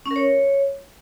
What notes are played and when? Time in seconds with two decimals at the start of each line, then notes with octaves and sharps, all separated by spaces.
0.06 C#4
0.11 A#4
0.16 C#5